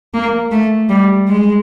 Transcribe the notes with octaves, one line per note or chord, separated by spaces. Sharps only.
A#3
A3
G3
G#3